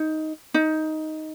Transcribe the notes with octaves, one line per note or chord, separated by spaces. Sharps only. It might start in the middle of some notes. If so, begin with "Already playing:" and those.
Already playing: D#4
D#4